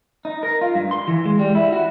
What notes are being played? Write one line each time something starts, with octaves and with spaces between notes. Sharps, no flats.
D#4
A#4
F4
G2
C6
E3
G#3
G3
E4
F#4